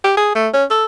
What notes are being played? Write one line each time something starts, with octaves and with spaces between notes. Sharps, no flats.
G4
G#4
A3
C#4
A4